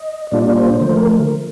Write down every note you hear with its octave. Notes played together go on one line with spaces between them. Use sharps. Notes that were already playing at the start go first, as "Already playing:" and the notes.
Already playing: D#5
A#2 G3 A#3 D4 F4 D5
C5
D3 F3 A3 C5
A#4